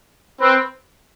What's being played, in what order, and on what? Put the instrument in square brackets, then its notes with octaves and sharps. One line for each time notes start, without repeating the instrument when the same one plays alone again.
[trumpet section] C4 [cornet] B4